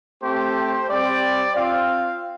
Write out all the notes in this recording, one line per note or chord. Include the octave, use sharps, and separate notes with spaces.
A3 C4 G4 C5
G3 C4 G4 D5
C4 F4 F5